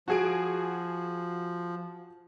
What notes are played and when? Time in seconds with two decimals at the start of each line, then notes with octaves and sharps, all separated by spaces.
0.08 F3 F#4 G#4 D7